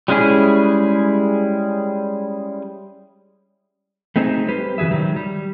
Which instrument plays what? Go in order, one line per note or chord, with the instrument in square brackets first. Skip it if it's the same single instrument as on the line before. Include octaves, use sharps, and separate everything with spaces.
[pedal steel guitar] G3 G#3 C#4 E4 G#4
[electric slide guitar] A3 C4 D#4 G#4 C5
G3 G4 B4 C5
C#3 E3 F#4 G#4 E5
D#3 F#3 G3
G3